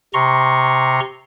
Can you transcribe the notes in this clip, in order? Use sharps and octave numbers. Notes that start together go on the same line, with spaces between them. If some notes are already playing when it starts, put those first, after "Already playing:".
C3 A#5 C6 C#6